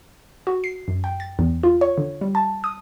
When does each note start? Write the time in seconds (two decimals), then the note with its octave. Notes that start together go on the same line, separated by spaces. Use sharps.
0.47 F#4
0.64 C7
0.88 F#2
1.04 G5
1.20 A6
1.39 E2
1.63 F4
1.81 C#5
1.98 D3
2.21 G3
2.35 A5
2.64 D#6